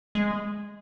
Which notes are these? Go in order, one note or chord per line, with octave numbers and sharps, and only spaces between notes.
G#3